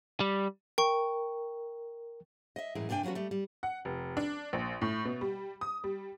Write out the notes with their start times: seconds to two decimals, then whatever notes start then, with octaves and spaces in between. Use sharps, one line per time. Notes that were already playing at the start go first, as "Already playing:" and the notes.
0.20 G3
0.78 A#4 G5 C#6
2.56 D#5 E5
2.75 F#2 A2 E3 G#3
2.89 G2 C3 D4 D#4 G5 G#5
3.03 F3 F#3 B3 C#4 F#4
3.15 G3 A3
3.31 G3
3.63 F#5
3.85 F1
4.17 D4
4.53 A#1
4.82 A2
5.05 B2
5.21 G3
5.61 D#6
5.84 G3